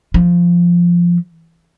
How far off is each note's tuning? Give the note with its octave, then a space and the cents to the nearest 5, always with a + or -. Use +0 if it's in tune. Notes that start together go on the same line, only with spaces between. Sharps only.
F3 -5